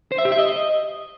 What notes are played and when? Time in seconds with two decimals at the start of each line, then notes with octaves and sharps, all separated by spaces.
0.12 C5
0.18 E5
0.25 G4
0.32 E5
0.39 D#5